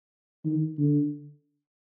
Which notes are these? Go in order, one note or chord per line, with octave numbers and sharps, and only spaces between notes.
D#3
D3